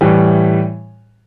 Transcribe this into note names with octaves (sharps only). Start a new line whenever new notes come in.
A2 E3 G3